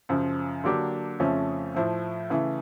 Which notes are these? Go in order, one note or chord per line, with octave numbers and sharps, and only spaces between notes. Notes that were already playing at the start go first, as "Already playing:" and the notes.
F#2 C#3 F3
D3 F#3 A#3 D4 G4
F2 C#3 F3 A3 C#4
A2 F3 A3
C#3 E3 A3